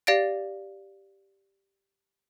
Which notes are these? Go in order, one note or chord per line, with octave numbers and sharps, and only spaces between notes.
G4 D5 F5 A6 A#6 D7